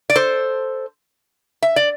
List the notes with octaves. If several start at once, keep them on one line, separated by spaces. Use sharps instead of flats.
D5
A4 C5
E5
D5